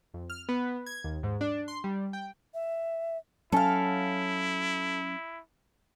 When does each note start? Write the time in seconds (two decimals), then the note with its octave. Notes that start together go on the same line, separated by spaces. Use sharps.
0.14 F2
0.30 F6
0.49 B3
0.86 G#6
1.04 D#2
1.23 G#2
1.41 D4
1.68 C6
1.84 G3
2.13 G5
2.54 E5
3.52 F#3 C#4 E4 A4 F5